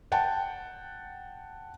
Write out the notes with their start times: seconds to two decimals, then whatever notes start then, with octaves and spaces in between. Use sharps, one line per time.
0.12 F#5 G5 A5